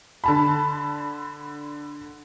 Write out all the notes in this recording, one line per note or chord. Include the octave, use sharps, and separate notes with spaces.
D3 A5 B5